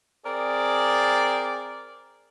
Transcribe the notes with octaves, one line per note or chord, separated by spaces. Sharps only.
C4 G#4 A#4 D5